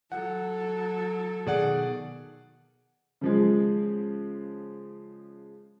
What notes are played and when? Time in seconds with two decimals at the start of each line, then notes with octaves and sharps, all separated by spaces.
0.12 F#3 A4 F#5
1.47 B2 D#3 G#4 D5 F#5
3.21 C#3 F3 G#3